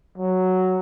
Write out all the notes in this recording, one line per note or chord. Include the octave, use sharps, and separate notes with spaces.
F#3